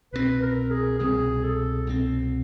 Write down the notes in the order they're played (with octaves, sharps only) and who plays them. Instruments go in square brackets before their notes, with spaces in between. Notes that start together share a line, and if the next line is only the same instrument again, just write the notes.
[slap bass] C2 B2 G3 C4 [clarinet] B4
[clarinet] A#4
G#4
[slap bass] C2 B2 G3 C4 [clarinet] G#4
[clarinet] A4
[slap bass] C2 B2 G3 C4